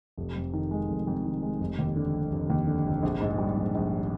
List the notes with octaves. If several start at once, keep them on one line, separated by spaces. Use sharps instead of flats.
F1
F2
D#3
G#3
F1
F2
D#3
G#3
F1
D#2
D3
F1
F1
D#2
D3
F1
A#1
G#2
G3
A#1
A#1